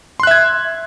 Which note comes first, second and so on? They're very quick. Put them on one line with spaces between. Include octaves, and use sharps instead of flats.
C6 F#6 E5 G#6